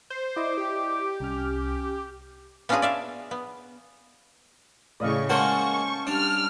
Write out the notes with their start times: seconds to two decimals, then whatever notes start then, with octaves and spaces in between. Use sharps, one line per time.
0.10 C5
0.36 E4 D5 D#5 D6
0.57 G4
1.20 C2 C#4 F6
2.69 B3 C#4 D4 F4 F#4 G#4
2.82 D5 E5 F5
3.31 B3
5.00 A2 C#3 D5 D#5 F5 C#6
5.29 G#3 A#3 C#4 F#4 C5 A5 C#6
6.07 G3 D4 F6